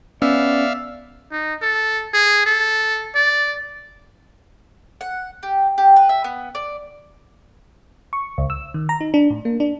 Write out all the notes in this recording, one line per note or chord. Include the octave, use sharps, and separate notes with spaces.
B3 C#4 D5 E5 F5
D#4
A4
G#4
A4
D5
F#5
G4
G4
B4
E5
B3
D5
C#6
C#2
E6
D#3
A#5
D#4
D4
A2
A#3
D4